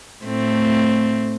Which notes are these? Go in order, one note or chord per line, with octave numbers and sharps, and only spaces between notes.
A2 A3 C4